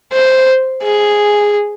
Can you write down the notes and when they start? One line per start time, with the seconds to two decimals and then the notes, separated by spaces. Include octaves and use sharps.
0.12 C5
0.83 G#4